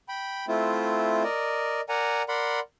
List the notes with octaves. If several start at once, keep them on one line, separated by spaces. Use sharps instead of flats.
G5 B5
A3 C4 E4 F4
A#4 D5 D#5
A#4 D5 F#5 G#5 A#5
A#4 D5 F#5 B5 C6